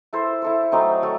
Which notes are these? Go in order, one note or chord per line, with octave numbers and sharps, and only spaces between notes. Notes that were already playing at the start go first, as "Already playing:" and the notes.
E4 A4 C5
E4 A4 C5
F#3 A3 C4 D#4
F#3 A3